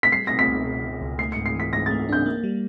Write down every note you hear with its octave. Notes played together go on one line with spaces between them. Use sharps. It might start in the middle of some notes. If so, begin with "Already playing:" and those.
B6
G3 C7
B2 A#6
B6
C#2
B2
B2
C#2
A3 C7
C#7
G#2
C7
E3 B6
G#2 A#6
A6
A3
D4 G6
A#3
G3